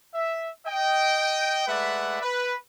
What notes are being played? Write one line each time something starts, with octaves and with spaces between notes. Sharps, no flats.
E5
D#5 G5
G#3 A3 B4 D5 E5 F#5
B4